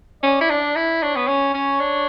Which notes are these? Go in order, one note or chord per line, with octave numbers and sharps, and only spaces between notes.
C#4 D5
E4
D4
E4
D4 C#5
B3
C#4
C#4
D4